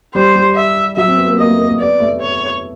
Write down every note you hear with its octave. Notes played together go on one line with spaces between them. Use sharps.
G3 C5
G3
E5
F#3 E5
C4
B3
A#3
A#3 D#5
A3
A#3
A3
B3 D5
A3
C#5